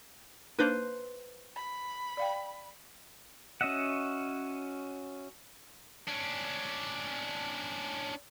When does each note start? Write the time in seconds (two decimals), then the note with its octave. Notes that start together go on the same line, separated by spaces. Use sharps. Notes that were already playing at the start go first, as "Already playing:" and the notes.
0.59 A#3 D4 D#4 B4 C5
1.56 B5
2.17 D5 F5 G5
3.61 C#4 F#4 D#5 E5 F#5
6.08 C#4 D4